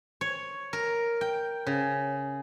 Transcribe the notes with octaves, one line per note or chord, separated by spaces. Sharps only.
C#5
A#4
G5
C#3